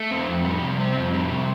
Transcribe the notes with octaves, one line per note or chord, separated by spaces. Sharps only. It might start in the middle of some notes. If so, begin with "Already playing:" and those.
Already playing: A3
C4
F2
G3
C3
C4
F2
G3
C3